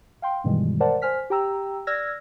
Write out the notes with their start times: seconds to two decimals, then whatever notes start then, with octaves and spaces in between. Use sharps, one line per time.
0.22 F5 G5 C6
0.44 G2 B2 D#3 E3 G3 G#3
0.80 A#4 C5 D5 F#5 A5
1.02 C5 G#5 F6 B6
1.30 G4 G5 A#5 E6
1.87 D5 E6 F6 G#6 A#6